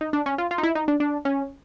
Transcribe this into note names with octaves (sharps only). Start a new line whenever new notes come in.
D#4
D4
C#4
F4
F4
D#4
E4
D#4
D4
D4
C#4